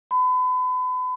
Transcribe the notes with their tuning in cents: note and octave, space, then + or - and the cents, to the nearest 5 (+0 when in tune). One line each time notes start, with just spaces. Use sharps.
B5 +35